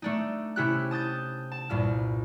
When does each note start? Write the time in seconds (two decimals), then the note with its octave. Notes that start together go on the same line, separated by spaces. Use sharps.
0.02 A3 D4 D#4
0.56 C3 C#4 E4 G4 F6 F#6
0.91 A5 D#6 G6 A6
1.52 A5
1.69 C2 G2 A#2 F6